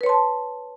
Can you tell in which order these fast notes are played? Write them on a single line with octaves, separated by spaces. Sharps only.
B4 C#5 C6 A5